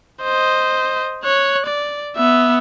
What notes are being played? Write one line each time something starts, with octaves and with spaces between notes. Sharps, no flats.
C5 D#5
C#5 F#6
D5
B3 E5